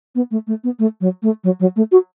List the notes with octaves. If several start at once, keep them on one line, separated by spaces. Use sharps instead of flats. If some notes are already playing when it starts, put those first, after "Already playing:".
B3
A3
A3
B3
A3
F#3
A3
F#3
F#3
A3
F#4